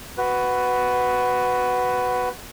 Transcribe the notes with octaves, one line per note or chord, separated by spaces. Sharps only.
F#4 B4